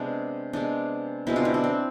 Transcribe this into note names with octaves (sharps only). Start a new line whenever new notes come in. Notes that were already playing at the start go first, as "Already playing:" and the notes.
Already playing: C3 G#3 B3 D4
C3 G#3 B3 D4
B2 G#3 B3 C4 E4
D4 F4
C4 E4
D4
C4